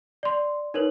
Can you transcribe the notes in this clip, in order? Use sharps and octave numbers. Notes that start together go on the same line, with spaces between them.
D5 C6
D#4 A#4 B4 C#5 F#7